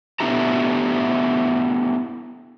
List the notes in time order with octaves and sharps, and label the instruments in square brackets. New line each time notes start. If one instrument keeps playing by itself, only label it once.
[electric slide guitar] A3 B3 D4 E4 G4 A#5